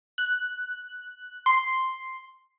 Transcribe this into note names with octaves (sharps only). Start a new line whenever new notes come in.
F#6
C6